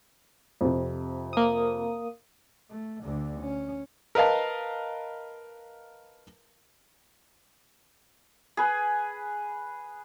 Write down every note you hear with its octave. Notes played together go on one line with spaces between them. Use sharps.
F2 C3
A#3 D#6
A3
D2 D3
C#4
A#4 B4 D#5 F5 A5
G#4 B4